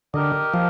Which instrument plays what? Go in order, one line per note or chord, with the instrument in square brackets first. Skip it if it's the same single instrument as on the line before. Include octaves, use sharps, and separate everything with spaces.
[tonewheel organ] D3 [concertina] G4 A#4 D#5
[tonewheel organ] F3